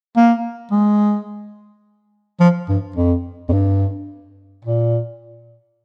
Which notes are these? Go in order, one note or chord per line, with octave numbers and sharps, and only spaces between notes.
A#3
G#3
F3
G2
F2
F2
G2
A#2